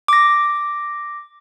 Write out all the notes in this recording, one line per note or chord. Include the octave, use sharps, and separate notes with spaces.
D6 A#6